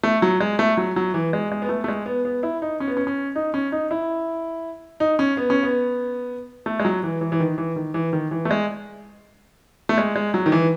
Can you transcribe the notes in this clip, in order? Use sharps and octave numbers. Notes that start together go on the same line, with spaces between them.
A3
F#3
G#3
A3
F#3
F#3
E3
G#3
G#3
B3
A3
A3
G#3
B3
B3
E4
D#4
C#4
B3
C#4
C#4
D#4
C#4
D#4
E4
D#4
C#4
B3
C#4
B3
A3
G#3
F#3
E3
E3
E3
D#3
E3
D#3
E3
D#3
E3
A3
G#3
A3
G#3
G#3
F#3
D#3
E3